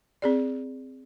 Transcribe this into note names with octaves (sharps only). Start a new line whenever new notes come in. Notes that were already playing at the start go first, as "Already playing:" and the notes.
C4 G#4 D5